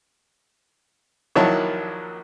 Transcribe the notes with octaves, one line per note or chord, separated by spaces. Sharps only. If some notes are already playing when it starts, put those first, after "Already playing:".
A#1 D#3 F#3 E4 C#5 A5